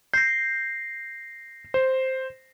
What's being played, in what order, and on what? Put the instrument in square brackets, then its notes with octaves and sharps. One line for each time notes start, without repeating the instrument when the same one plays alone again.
[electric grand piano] G6 [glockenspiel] A#6 C7
[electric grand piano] C5